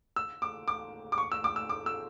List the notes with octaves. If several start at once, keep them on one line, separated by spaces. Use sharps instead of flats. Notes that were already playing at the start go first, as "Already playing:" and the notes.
E6
D6
D6
D6
C#6
E6
D6
E6
D6
E6